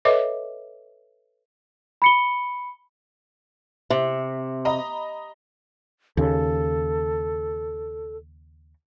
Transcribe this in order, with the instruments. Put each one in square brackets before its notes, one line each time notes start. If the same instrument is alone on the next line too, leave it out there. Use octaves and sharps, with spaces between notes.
[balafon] A4 B4 C#5 D#5 E5 D6
[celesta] B5 C#7 G7
[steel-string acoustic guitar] C3
[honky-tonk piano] D#5 A#5 B5
[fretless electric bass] D#2 C#3 [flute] A4